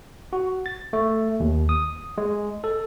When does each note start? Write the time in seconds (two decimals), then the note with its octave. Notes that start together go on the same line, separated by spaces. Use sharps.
0.33 F#4
0.66 A6
0.93 A3
1.40 D#2
1.69 D#6
2.18 G#3
2.64 A4